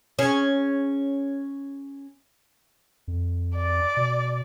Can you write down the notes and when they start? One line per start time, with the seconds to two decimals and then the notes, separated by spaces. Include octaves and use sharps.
0.19 C#4 G#4
3.08 F2
3.56 D5
3.97 B2